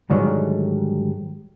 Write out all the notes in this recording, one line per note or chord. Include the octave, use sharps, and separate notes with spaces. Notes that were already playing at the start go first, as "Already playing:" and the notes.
G#2 D3 D#3 F#3 G3 A3